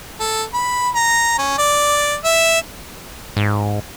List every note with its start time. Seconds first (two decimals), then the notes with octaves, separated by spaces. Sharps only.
0.20 A4
0.54 B5
0.95 A#5
1.38 C#4
1.58 D5
2.24 E5
3.37 G#2